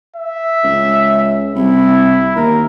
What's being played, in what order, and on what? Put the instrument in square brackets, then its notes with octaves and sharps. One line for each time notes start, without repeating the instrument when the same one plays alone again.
[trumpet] E5
[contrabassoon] C#2
[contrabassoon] C2 [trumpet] E4
[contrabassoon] D#2 [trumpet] A#4